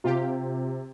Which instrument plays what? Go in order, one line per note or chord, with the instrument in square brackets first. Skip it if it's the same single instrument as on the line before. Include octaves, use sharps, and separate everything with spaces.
[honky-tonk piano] C3 [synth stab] F4 G4